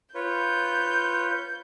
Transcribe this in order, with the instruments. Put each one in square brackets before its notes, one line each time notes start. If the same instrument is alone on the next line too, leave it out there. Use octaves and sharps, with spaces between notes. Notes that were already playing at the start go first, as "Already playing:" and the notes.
[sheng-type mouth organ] F4 B4 C#5 [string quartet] G6